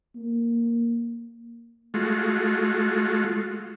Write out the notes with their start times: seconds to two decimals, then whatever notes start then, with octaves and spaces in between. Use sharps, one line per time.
0.16 A#3
1.94 G#3 A3 F4 F#4